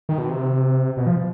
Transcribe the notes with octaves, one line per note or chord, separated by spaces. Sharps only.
D#3
B2
C3
B2
F3